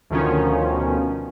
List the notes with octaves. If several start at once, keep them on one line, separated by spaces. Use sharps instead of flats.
D2 B2 D#3 F3 C#4